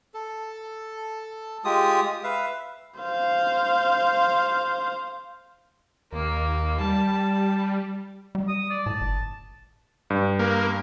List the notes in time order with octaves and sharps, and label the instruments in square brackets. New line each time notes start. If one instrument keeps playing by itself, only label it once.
[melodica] A4
G#3 F4 G4 D#6
B4 E5 F5
[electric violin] C5 F5
[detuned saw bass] D#2 [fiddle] A#3
[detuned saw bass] G3 [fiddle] A5
[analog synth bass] G3
[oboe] D#6
D5
[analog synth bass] A2 [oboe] A5
[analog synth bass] G1
[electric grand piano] G2
[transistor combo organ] A#3